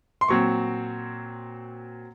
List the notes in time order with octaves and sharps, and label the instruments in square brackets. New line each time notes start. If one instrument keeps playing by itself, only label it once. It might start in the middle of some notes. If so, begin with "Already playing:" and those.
[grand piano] C6
A#2 F#3 C4 C#6